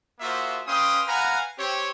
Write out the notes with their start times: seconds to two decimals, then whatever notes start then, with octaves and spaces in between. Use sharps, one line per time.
0.21 A#3 F4 F#4 G#4 C5 E5
0.67 C#4 B4 F5 G5 C6 D#6
1.07 B4 F5 F#5 G#5 A#5
1.57 C4 G4 C#5